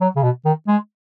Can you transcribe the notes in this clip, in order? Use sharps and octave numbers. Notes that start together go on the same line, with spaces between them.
F#3
C#3
B2
D#3
G#3